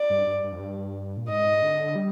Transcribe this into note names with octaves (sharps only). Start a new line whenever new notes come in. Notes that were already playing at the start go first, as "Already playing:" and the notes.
Already playing: D5
G2
G2
G2
F2
G2
A#2
G#2 D#5
D3
G3